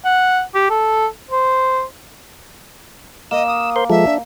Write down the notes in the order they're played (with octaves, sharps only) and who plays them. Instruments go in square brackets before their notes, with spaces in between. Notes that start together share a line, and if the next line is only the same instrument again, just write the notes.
[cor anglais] F#5
G4
A4
C5
[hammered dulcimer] A#3 [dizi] D#5 [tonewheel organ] E6
[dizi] D#6
[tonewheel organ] A#4 C5 C6
[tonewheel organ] F3 G#3 A4 [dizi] E5
[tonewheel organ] D4